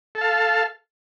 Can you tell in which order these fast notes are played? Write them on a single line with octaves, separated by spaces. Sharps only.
A4 A5 F5